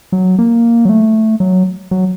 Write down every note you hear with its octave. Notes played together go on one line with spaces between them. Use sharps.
F#3
A#3
F#3
A3
F#3
F#3